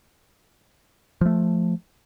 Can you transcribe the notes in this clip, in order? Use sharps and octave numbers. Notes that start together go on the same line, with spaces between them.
F3 A3